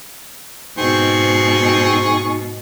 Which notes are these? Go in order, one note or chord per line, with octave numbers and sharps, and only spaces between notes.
G#2 B2 C4 D#4 G#4 C#6